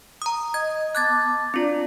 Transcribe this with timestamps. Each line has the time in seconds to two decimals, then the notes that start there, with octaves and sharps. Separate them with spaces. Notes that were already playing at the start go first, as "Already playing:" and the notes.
0.22 A#5 D#6
0.54 D#5 D#6 G#6
0.95 B3 A5 D6 F#6 G#6 A6
1.54 C4 D4 F4 D5